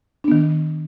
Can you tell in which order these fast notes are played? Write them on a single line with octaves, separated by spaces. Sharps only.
D4 B3 D#3